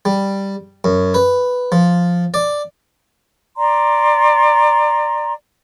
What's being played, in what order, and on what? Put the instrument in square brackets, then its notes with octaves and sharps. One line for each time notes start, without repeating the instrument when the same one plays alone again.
[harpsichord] G3
F#2
B4
F3
D5
[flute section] D5 A#5 C6